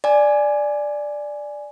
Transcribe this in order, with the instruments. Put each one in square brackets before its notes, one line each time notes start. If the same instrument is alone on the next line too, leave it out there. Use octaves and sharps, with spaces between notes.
[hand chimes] D5 G#5